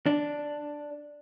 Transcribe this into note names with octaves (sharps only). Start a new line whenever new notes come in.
D4